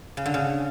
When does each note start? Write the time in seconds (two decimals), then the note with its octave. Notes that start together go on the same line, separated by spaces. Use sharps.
0.17 C#3
0.26 D3
0.34 C#3